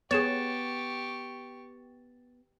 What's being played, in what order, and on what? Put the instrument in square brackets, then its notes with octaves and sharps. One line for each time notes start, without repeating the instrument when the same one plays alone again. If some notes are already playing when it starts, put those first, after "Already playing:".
[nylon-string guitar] B3 [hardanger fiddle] G4 C#6 [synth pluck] G#4 C#5 [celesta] A6 E7